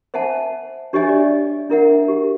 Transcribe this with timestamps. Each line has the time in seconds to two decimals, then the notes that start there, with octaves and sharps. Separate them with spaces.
0.14 C5 E5 F#5 G#5 A5
0.93 D4 G4 C#5 D#5 E5 G#5
1.09 D5
1.69 D4 E4 A#4 E5 F#5
2.08 G4